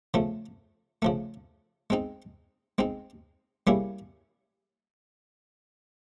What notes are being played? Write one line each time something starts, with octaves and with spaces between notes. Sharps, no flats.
C#3 F3 A3
C#3 F3 A3
G#3 C4 D#4
G#3 C4 D#4
G3 A#3 C#4 E4 G#4